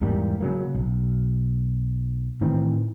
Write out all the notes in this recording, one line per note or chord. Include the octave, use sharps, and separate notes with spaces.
E2 G#2 G3 A#3
C#3 F#3 A#3
B1
A2 D#3 E3 C4